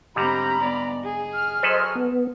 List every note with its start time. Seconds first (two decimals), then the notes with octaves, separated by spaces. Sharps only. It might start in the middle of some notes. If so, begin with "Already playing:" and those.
0.16 G#2 D3 G3 C4 G4 A#5 B5
0.58 B3 D5
1.04 G#4
1.34 F6
1.63 F#3 A4 B4 C5 D#5
1.95 B3